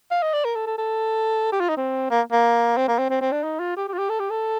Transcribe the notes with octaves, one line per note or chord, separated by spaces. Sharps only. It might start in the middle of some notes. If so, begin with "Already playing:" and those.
F5
D#5
D5
A#4
A4
A4
A4
G4
F4
D#4
C4
A#3
A#3
C4
A#3
C4
C4
C4
D4
D#4
F4
G4
G4
F4
G4
A4
G4
A4